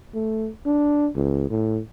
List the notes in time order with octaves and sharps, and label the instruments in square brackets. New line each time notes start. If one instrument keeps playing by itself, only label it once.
[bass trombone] A3
D4
C#2
A2